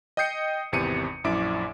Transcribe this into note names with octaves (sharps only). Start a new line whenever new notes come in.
D#5 G5 D#6 G6 C7 C#7
G#1 E2 C3 C#7 D#7
A#1 F#2 E4 D6 D7